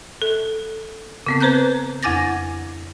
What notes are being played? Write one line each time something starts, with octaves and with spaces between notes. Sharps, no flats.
A4
C#3 B3 C4
B4 C5 A#5 F#6 G6
F2 E4 G#5 D6 A6 A#6